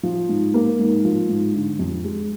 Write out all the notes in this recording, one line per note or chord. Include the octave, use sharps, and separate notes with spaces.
F3
G#2
A#3
G#2
F3
G#2
D3
F2
G#3